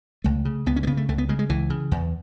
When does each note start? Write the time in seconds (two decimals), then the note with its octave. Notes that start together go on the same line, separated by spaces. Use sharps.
0.24 C#2 A3
0.45 C#3
0.66 C#2 B3
0.76 C#4
0.83 A3
0.87 C#3 B3
0.97 A3
1.09 C#2 A3
1.18 B3
1.29 C#3 G#3
1.39 G#3
1.49 C#2 E3
1.70 C#3
1.91 E2